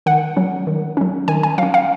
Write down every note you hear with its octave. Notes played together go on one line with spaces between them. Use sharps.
D#3 F#5
F#3 C#4
D#3
F#3 C#4
D#3 G#5
G#5
F#3 C#4 F5
F5